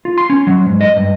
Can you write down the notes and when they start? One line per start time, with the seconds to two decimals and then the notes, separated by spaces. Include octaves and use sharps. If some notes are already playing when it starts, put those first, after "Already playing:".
0.05 F4
0.18 C6
0.30 C#4
0.47 F#3
0.66 G#2
0.81 D#5
0.96 G2